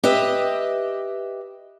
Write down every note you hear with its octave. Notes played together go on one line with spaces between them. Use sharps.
G4 B4 D#5 E5